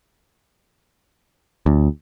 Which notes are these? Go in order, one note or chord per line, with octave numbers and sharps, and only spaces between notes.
D2